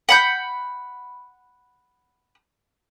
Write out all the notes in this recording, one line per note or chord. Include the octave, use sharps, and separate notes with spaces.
F#5 B5 G6